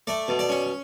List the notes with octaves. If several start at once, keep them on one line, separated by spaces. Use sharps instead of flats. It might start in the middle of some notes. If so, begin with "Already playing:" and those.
A3 D5
B2
D5
C#4